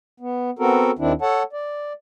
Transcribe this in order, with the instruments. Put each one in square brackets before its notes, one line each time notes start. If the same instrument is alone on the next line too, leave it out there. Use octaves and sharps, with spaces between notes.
[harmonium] B3
B3 C4 F#4 A4 A#4
D#2 D#3 C4 D4 E4
A4 C#5 F#5 A5
D5